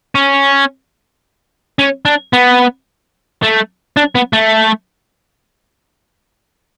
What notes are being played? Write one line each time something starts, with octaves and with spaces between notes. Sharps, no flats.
C#4
C#4
D4
B3
A3
D4
B3
A3